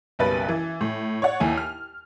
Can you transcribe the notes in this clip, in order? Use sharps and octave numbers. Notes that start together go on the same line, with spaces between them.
F#1 B1 G3 B4 A6
E3
A2
C#5 D5 F#5
D#2 E4 G#5
F6